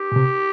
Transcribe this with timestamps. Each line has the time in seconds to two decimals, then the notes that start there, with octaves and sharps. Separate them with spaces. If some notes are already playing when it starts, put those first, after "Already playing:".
Already playing: G4
0.12 A#2
0.16 C3